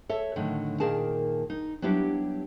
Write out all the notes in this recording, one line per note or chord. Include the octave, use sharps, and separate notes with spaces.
A4 C#5 E5
A2 D3 D#3 F#3
A#2 D#3 G#4 A#4 A5
D#4
F#3 G3 B3 D4 E4 G4